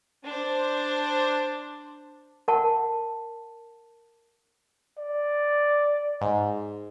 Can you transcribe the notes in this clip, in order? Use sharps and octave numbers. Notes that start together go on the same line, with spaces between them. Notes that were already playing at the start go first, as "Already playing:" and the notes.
D4 C5
A#4 F#5 A5
D5
G#2